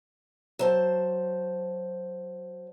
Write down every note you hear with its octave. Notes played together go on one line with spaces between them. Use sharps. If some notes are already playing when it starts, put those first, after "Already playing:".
F#3 C5 A5